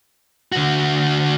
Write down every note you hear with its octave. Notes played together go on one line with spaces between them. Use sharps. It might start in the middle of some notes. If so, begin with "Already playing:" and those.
D3 F#4